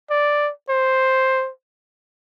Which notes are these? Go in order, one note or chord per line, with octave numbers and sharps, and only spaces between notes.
D5
C5